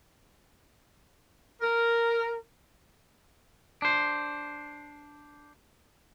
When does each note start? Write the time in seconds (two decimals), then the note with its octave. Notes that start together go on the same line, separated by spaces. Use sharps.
1.62 A#4
3.82 D4 C5